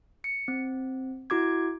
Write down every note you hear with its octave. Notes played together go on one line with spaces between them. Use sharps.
C#7
C4
E4 F#4 D6 G#6